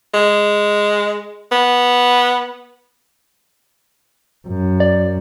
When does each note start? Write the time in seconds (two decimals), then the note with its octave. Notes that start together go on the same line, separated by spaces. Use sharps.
0.14 G#3
1.52 B3
4.48 F#2
4.80 D5